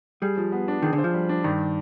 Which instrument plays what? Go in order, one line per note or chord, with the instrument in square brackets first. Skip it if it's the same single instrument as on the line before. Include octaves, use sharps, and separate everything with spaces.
[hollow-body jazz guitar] G3 [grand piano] G#4
[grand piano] F3
B3
D4
[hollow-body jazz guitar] D#3 [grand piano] G#4
[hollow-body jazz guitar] D3
[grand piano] C5
[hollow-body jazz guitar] F3
[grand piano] G3
D4
[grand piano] G2 [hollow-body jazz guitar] D#3